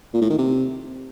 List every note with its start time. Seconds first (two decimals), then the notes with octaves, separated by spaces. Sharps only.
0.13 A#2
0.22 A2
0.30 D#3
0.38 C3